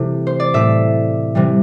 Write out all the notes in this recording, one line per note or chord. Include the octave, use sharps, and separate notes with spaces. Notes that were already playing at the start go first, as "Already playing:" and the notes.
Already playing: C3 E3 A3
C5
D5
A2 A3 E5
C3 E3 G3